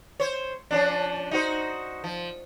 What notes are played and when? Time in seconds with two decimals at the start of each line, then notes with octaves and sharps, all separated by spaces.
0.20 C5 C#5
0.71 F3 C#4 D4
1.31 D#4 F#4 C5
2.04 F3